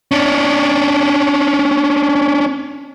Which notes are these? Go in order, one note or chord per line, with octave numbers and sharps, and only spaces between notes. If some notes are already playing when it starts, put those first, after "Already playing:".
C#4 D4